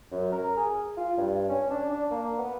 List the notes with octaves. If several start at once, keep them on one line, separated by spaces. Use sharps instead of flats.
F#2
A#4
G#4
F4
G2
C#4
D4
D4
A#3
B3